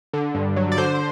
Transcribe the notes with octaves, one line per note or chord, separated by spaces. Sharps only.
D3
G2
F#3
D5
D3 C5